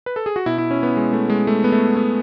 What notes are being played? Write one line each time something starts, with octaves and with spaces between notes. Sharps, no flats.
B4
A4
G#4
F#4
B2 E4
E4
C#4
B3
G#3
A3
G#3
A3
B3
A3
B3